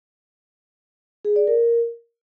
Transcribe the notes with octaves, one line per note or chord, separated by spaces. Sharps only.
G#4
D5
A#4